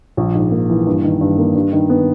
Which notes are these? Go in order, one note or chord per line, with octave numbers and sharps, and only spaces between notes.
A#1
G#2
A#3
E3
G2
D#3
G2
A#3
G2
D#3
B3